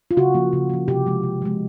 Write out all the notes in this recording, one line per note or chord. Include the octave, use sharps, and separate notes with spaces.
F4
C#3 F#4
F3 A#3
C#3
F3 A#3
C3 G4
F3 G#3
C3
F3 G#3